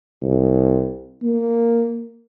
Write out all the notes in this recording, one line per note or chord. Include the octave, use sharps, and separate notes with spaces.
C2
A#3